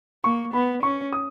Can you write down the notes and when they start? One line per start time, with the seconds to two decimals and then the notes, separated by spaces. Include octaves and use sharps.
0.24 A#3 C#6
0.53 B3 B5
0.83 C#4 C#6
1.13 D#6